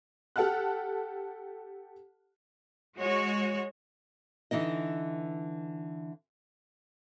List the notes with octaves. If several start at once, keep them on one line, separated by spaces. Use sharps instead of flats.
G4 A4 F#5 A5 F6 F#6
G#3 F#4 C#5
D3 E3 D#4 D#5